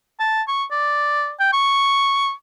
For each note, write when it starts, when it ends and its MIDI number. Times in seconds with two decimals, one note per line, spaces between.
0.20 0.42 81
0.48 0.64 85
0.71 1.32 74
1.40 1.50 79
1.53 2.32 85